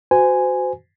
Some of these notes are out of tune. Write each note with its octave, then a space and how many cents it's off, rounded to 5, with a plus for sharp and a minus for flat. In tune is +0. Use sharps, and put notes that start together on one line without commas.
F#4 +0 C5 -35 G#5 +0